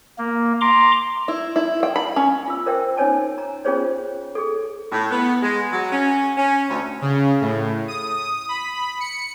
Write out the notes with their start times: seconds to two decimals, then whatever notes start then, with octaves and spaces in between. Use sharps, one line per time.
0.19 A#3
0.61 A#5 C6 D6
1.28 E4
1.56 E4
1.83 G5
1.96 B5
2.16 C#4
2.48 F4 E6
2.66 A#4 C5 E5 G5
2.97 C#4 D#4 C5 C#5 G#5 A5
3.38 A#5
3.65 C#4 F4 G#4 C5 C#5
4.35 G#4 A4
4.92 A2
5.11 B3
5.42 G#3
5.73 F#3
5.92 C#4
6.38 C#4
6.69 D2
7.02 C#3
7.41 A2
7.88 D#6
8.49 B5
9.00 C#7